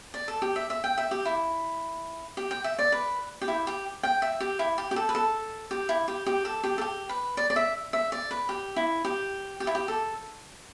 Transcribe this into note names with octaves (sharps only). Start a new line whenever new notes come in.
D5
A4
G4
E5
E5
G5
E5
G4
E4
G4
G5
E5
D5
B4
G4
E4
G4
G5
E5
G4
E4
G4
G4
A4
B4
A4
G4
E4
G4
G4
A4
G4
A4
G4
B4
D5
D5
E5
E5
D5
B4
G4
E4
G4
G4
E4
G4
A4